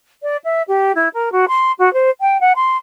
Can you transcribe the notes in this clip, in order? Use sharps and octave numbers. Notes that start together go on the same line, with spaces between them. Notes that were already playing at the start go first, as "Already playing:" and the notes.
D5
E5
G4
E4
A#4
F#4
C6
F#4
C5
G5
F#5
C6